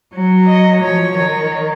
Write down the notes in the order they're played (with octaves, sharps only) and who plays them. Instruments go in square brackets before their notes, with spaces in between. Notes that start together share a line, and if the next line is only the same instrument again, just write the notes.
[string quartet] F#3
[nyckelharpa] D#5
[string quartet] F3 [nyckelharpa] C#5
[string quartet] D#3 [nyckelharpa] C#5